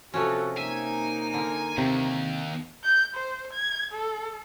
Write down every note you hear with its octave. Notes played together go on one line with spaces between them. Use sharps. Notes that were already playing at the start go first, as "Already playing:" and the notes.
C3 F3 C#4 F#4 A4
A#3 D#4 E5 G#5
D3 A#4
D#2 C3
G6
C5
G#6
A4